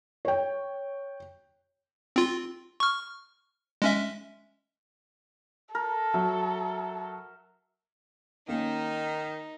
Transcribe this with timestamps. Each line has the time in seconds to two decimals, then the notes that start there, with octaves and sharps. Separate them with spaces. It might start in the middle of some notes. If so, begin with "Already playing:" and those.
0.25 C#5 G5
2.16 C4 F4
2.80 C#6 F6
3.82 G#3 C#4 E5
5.75 A4 A#4
6.14 F#3 E5
8.48 D#3 A#3 C#4 D#4